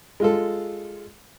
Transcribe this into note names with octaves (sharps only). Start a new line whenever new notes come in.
G#3 F4 A4